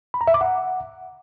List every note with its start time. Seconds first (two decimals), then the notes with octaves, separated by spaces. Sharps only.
0.14 B5
0.21 A#5
0.27 E5
0.34 D6
0.41 F#5